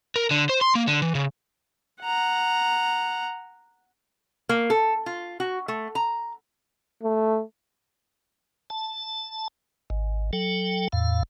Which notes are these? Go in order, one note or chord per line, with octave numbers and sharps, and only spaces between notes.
A#4
D3
C5
C6
A#3
D3
E3
C#3
F#5 A#5
A#3
A4
F4
F#4
A3
A#5
A3
A5
G#1
F#3 A4 G5
E2 A2 F5